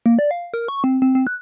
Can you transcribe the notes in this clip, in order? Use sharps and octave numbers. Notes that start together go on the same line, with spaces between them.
A#3
D5
F5
A#4
C#6
C4
C4
C4
F#6